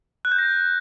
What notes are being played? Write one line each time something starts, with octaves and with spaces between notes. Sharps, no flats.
F#6
G6
A#6